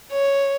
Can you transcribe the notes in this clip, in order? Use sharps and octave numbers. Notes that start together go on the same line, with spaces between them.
C#5